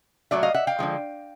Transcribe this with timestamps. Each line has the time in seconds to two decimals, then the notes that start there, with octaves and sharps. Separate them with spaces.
0.31 A#2 F#3 A3 D5 E5
0.43 D#5 F5
0.54 E5 F#5
0.67 F5 G5
0.79 D3 F3 G#3